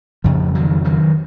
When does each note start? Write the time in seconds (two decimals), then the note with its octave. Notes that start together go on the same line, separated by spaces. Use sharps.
0.24 F2 C#3 F3
0.55 D#3 F#3
0.84 D#3 F#3